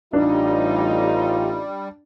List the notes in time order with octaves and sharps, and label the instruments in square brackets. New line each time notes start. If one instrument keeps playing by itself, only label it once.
[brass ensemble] A1 D#4 [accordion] G3 [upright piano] D4 [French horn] F4